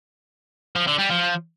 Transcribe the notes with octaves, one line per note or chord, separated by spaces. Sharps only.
F3
D3
G3
F3